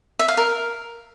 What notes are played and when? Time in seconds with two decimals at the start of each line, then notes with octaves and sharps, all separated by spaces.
0.19 E5
0.28 F5
0.37 A#4